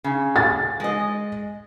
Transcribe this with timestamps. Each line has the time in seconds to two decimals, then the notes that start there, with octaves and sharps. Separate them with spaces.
0.04 C#3
0.36 A6
0.80 G#3 D#5